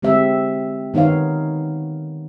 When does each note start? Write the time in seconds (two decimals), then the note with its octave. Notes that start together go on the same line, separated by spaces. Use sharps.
0.02 D3 G#3 C4 G4 E5
0.94 D#3 B3 D#4 C#5 F5